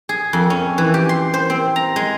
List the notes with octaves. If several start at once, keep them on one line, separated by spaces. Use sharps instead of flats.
G#4
F2
C#4
E3
G4
C6
C5
C4
A#5
G#3